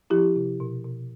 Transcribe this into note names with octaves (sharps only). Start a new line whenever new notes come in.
F3 E4 G4
C3
B2
B2